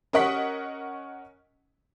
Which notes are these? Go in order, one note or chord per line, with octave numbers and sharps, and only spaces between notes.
C#4 A#4 D#5 F#5 C#6 B6